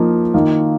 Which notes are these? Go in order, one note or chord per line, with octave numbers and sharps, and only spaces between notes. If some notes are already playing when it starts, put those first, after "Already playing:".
Already playing: F3 A#3 D#4
D#3 A#3 F4